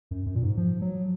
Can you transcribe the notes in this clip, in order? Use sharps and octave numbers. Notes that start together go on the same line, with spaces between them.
F#2
F#2
A#2
G#2
F3
F#3